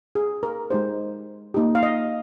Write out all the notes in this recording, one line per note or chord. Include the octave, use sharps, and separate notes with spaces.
G#4
A#4
G#3 D#4 G4 C5
A#3 D#4 G4
F5
D#5